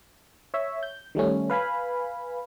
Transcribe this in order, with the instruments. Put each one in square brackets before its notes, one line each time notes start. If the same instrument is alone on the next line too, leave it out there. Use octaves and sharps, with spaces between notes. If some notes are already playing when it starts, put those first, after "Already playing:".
[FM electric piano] C#5 E5
G6
D#3 G3 A3 C#4
B4 F5 G#5 B5